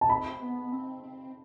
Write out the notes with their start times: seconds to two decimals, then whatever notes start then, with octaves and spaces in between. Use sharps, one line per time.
0.01 A5
0.09 C4 B5
0.41 B3
0.72 C4
1.03 C4